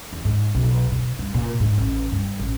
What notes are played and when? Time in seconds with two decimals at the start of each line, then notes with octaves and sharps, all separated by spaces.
0.13 E2
0.25 G#2
0.55 B1
0.92 B2
1.19 G2
1.34 A#2
1.60 G#2
1.78 A1
2.12 G2
2.40 A1